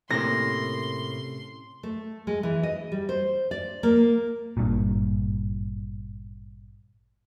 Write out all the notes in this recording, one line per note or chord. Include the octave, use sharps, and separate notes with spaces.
A2 C3 A#3 C#4 A4 C6 A#6
A3
G#3
E3
D#5
G3
C5
D5
A#3
G#1 G2 A#2